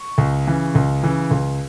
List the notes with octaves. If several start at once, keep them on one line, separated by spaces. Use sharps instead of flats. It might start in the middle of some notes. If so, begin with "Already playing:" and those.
Already playing: C#6
C#2
C#3 E3
C#2
C#3 E3
C#2